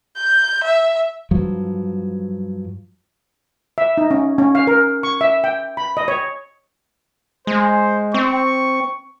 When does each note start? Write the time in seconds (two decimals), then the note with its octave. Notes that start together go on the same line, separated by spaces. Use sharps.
0.16 G6
0.64 E5
1.31 G2 F3 F#3
3.78 E5
3.97 D#4
4.11 C#4
4.38 C#4
4.55 F5
4.67 A#4
5.03 C#6
5.21 E5
5.44 G5
5.77 B5
5.97 D#5
6.08 C#5
7.47 G#3 C5
8.14 C4 C#6